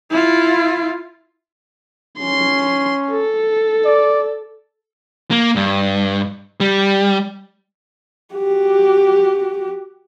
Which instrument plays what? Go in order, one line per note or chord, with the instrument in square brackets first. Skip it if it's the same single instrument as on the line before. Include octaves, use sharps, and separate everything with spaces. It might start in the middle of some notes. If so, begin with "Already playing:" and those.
[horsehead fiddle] E4 F4
[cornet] C#4 [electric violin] C6
[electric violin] A4
[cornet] D5
[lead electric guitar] A#3
G2
G3
[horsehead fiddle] F#4 G4